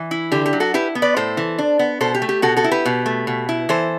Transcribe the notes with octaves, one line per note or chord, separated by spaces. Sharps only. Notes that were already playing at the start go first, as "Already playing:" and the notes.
Already playing: E3
E4
D3 G4
G4
F#3
F#4 A4
E4 G4 B4
B3
B4 D5
A2 A4 C5
E3
D4
B3
B2 A4 C5
G4
A3
G4
B2 F#4 A4
F#4 A4
E4
G4 B4
B2
A3
B2
E4
E3 A4 C5